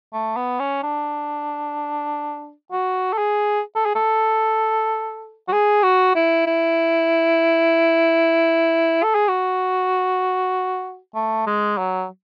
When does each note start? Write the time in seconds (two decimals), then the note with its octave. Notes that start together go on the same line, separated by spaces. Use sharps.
0.13 A3
0.36 B3
0.60 C#4
0.83 D4
2.71 F#4
3.13 A4
3.18 G#4
3.75 A4
3.85 G#4
3.95 A4
5.48 F#4
5.52 G#4
5.83 F#4
6.15 E4
6.47 E4
9.03 A4
9.15 G#4
9.28 F#4
11.15 A3
11.47 G#3
11.77 F#3